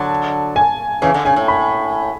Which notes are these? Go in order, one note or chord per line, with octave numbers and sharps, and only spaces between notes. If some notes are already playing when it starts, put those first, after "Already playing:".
Already playing: D3 F#3 A5
G#5
C#3 E3 G#5
D3
C#3 G#5
A2
B5